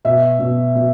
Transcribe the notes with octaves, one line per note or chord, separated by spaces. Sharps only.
B2 E5
B2
B2